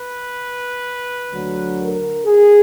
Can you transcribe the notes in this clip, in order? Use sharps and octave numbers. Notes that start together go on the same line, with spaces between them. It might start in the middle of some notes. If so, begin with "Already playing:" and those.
Already playing: B4
D2 D3 F#3
A#4
G#4